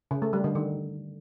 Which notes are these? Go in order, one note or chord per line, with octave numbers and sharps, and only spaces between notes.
C#3
A3
G3
D3
D#3